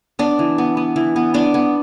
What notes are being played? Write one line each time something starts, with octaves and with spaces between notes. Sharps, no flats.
B3 D4
E3
B3
B3
E3
B3
B3 D4
B3